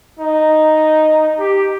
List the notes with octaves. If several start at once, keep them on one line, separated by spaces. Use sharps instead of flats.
D#4
G4